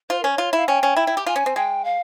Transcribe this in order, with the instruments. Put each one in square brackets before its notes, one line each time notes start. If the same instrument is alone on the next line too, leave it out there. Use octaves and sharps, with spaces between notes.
[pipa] F4 [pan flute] C5
[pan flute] A#4
[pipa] C#4 [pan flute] C#5
[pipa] F4
[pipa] E4 [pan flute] F5
[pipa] C#4 [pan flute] G5
[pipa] C#4
E4
E4
G4
[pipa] F4 [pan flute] G#5
[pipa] C#4
C4
[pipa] G#3 [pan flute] G5
[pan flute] F5